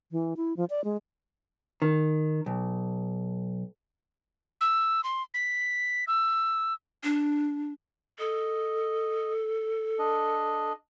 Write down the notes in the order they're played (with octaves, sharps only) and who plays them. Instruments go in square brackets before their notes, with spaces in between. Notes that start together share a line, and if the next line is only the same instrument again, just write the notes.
[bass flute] E3
E4
F3
D5
G#3
[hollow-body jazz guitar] D#3
B1
[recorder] E6
C6
B6
E6
[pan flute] D4
[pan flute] A4 [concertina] D#5
[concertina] D4 D#5